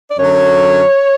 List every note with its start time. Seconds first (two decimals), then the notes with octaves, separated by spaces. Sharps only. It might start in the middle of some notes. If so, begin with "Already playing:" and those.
0.10 D5
0.18 F#2 D3 F#3 C#5